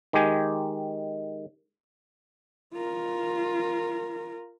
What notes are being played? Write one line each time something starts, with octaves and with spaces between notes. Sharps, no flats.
D#3 G#3 G4 G#5
F4 A#4